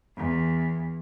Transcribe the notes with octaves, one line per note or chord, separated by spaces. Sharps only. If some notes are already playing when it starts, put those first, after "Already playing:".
E2